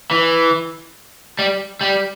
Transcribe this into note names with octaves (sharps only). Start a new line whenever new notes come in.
E3
G3
G3